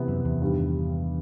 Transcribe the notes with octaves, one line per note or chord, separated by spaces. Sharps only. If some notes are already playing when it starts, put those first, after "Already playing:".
Already playing: C3 E3 B3
F#2
E2
G2 D#3 G3